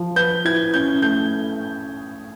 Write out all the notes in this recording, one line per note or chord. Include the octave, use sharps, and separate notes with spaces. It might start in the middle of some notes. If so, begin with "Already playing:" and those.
Already playing: F3
B4 G6
E4 G#6
C#4 G6
A3 G6